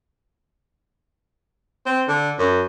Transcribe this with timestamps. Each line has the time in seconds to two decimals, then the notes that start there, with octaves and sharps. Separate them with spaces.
1.86 C4
2.08 D3
2.39 F#2